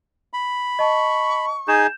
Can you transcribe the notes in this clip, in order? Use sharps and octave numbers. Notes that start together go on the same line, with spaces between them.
B5
D#5 A5 C#6
D#4 G#4 G6 E7